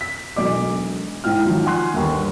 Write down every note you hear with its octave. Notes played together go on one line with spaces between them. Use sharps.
B6
E1 B1 D#5 D6
G#2 E4 G5 F6
D#3 F3 F#3
F#5 G#5 C6 F#6
G1 D#2